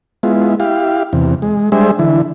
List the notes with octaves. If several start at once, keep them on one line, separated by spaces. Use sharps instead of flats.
G#3 B3 E4 F4
E4 G4 F5
E2 C3
G#3
G3 G#3 D4 G#4 C5 E5
D3 E3 E4